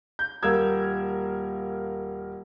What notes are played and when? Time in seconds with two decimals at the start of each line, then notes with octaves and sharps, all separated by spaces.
0.19 G6
0.43 D#1 A#3 A#4 E6 G#6